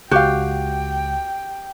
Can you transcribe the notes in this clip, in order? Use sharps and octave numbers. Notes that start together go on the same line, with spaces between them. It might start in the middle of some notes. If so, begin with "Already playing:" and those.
C#2 F#4 G4 F5 G5